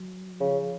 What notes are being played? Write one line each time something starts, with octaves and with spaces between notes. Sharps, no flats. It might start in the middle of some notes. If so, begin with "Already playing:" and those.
Already playing: F#3
C#3 F3